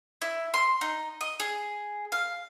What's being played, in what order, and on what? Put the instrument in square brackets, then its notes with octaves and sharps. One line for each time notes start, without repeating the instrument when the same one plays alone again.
[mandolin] E4
C6
D#4
D#5
G#4
F5